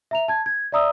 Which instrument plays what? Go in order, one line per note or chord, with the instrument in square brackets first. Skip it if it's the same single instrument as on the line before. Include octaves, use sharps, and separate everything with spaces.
[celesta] E5 A#5 F7
A5 G#6
G#6
D5 E5 A#5 D#6 E6